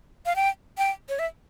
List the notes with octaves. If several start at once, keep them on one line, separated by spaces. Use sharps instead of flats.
F5
G5
G5
C#5
E5